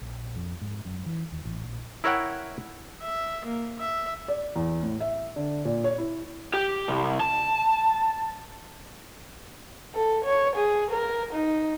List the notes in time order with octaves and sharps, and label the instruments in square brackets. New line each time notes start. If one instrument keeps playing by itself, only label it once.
[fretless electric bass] A#1
F2
G#2
F#2
E3
D#2
A1
A#1
[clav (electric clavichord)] E4 A#4 C#5 E5 F#5 G5
[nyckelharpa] E5
A#3
E5
[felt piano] D5
E2
A2
E5
D3
A#2
C#5
E4
[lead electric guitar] G4
C2
A5
[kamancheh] A4
C#5
G#4
A#4
D#4